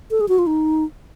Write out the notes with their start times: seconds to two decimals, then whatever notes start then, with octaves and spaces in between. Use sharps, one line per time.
0.11 A4
0.21 G#4
0.29 F#4
0.39 F4
0.47 D#4